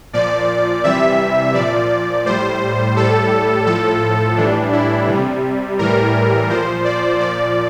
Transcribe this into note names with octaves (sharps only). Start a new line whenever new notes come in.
A#2 F3 D5
C3 E3 G3 E5
A#2 F3 D5
A2 G3 C5
A2 G3 A4
A2 F3 A4
A2 E3 G3 D4
E4
C3 G3
A2 E3 G3 A#4
A#2 F3 C5
D5
A#2 F3 D5